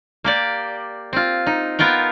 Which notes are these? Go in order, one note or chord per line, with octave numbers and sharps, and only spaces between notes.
A#3 G4 D5
C4 F4
D#4
B3 F4 A#4 G5